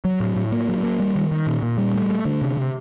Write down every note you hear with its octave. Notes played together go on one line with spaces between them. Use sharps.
F#3
A2
A2
A#3
F#3
A#3
G3
D#3
D#3
A#2
A#2
G3
A3
A3
D3
C3
C3